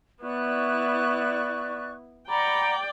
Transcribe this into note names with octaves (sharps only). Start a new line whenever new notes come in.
B3 E4 D5 C#6 F#6
D5 F#5 G5 A#5 B5